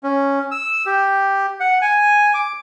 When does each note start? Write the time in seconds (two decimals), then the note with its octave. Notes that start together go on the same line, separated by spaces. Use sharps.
0.04 C#4
0.52 E6
0.86 G4
1.60 F#5
1.82 G#5
2.34 D6